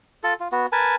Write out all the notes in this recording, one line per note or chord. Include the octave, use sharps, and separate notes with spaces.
F4 A4
F4
B3 F#4
A#4 B4 G#5 A5